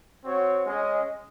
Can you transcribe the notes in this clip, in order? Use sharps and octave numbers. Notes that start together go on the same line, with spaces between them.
C4 F#4 C#5
G#3 C#4 G#4 D#5